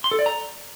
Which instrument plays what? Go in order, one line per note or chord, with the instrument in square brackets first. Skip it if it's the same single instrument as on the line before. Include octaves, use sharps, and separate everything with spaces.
[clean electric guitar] C6
A4
D5
A#5